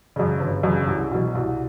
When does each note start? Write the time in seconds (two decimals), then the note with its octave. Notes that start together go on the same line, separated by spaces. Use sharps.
0.16 F#2 C#3
0.40 G1
0.63 F#2 C#3
0.87 C2
1.11 B2 F#3
1.35 C2